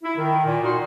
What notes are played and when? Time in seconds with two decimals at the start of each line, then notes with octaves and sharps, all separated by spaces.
0.03 E4
0.17 D#3
0.45 A#2
0.62 A#2 D#4 F#4 A#4 C6